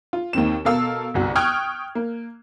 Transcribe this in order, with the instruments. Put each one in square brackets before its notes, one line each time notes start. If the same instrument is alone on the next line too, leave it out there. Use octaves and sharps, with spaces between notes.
[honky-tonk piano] F4
D#2 D#3 C4 E7
B2 A4 A#4 F5 E6
G1 C2 F#4
G5 C#6 D#6 F6 F#6 G#6
A#3